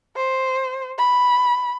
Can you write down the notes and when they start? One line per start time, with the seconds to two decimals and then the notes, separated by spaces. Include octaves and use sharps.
0.16 C5
0.98 B5